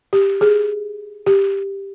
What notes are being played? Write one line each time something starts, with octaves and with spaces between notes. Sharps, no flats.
G4
G#4
G4